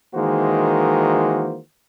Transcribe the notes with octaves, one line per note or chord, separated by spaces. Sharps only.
D#3 E3 G#3 A#3 F#4 C5